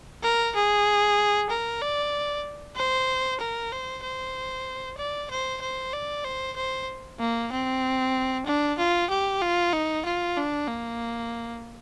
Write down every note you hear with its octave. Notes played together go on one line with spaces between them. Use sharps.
A#4
G#4
A#4
D5
C5
A#4
C5
C5
D5
C5
C5
D5
C5
C5
A#3
C4
D4
F4
G4
F4
D#4
F4
D4
A#3